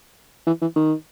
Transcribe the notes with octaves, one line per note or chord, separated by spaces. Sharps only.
E3
E3
D#3